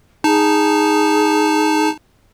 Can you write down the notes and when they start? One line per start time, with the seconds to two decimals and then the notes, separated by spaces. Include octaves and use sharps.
0.24 D#4 G#4 A5